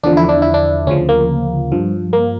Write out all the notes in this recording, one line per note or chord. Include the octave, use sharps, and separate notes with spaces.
E2 D3 F3 D4
E4
D4
E4
D4
D2 C#3 F3 C#4
A#3
G2 F3
A#3